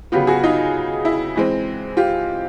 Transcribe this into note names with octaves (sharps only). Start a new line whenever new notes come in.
C#3 F#3 B3 F4 G4
F#4 G#4
D#4 F4
E4
E3 G#3 C4
F4 G4